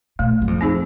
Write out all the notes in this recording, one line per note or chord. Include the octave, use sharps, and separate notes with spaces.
A#2 A3
F#2
F2
C4 D#4 G#4 C5